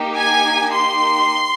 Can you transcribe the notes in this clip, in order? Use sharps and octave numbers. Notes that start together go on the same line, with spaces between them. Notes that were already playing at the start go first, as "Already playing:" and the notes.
Already playing: A#3 D#4 G4
G#5
C6